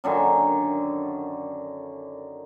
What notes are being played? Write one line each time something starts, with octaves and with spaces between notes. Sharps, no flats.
F#2 D3 D#3 G#5